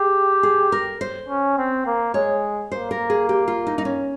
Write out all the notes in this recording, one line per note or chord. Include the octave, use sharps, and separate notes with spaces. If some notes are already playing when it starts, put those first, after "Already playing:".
Already playing: G4 G#4
G#4
A#4
C5
C#4
C4
A#3
G#3 C#5
A#3 C5
A#4
G#4
G4
F4
D#4
D#4
C#4